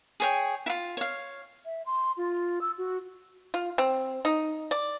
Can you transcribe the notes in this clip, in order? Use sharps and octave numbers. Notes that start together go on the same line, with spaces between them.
G#4 C#5 G5
E4 F4
C#5 F5
E5
C6
F4
E6
F#4
F4
C4
D#4
D5